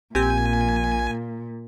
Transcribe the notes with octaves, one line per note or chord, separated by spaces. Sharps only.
A#1 A#2 C4 G4 G#5 G6